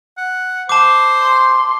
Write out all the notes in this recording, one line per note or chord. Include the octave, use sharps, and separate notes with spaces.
F#5
C5 A5 D6
C6